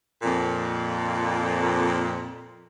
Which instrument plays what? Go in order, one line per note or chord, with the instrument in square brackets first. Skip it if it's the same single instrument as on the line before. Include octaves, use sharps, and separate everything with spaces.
[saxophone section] F2 A#2